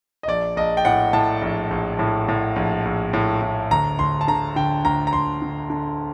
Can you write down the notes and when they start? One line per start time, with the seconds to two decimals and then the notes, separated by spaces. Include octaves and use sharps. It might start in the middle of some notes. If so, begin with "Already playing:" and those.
0.23 D#5
0.28 A#1 D5
0.56 A#1 D#5
0.77 G5
0.85 A2 F#5
1.13 A2 A5
1.42 A#1
1.71 A#1
1.99 A2
2.28 A2
2.56 A#1
2.85 A#1
3.13 A2
3.41 A2
3.71 D2 A#5
3.99 D2 C6
4.21 A5
4.28 D3 A#5
4.56 D3 G5
4.85 D2 A#5
5.07 A#5
5.13 D2 C6
5.42 D3
5.70 D3